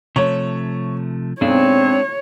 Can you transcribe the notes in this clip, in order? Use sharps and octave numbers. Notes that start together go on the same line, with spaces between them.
C3 F3 A3 C#5
B1 G#3 C4 D4 C#5